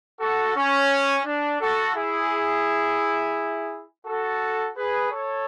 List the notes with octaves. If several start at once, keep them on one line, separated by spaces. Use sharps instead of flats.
F#4 A4
C#4
D4
F#4 A4
E4 G#4
F#4 A4
G#4 B4
A4 C#5